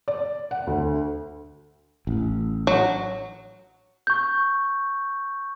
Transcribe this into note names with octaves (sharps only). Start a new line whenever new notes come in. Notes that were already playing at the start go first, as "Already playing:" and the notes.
D5
F#5
D2
A1
F#3
C#6 G6